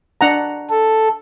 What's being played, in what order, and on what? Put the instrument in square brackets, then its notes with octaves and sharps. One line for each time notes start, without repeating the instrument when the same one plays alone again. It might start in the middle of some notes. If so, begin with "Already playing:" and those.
[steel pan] D4 F#5 A#5
[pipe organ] A4